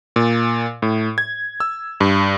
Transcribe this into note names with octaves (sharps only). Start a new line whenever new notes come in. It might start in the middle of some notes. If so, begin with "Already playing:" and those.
A#2
A2
G#6
E6
G2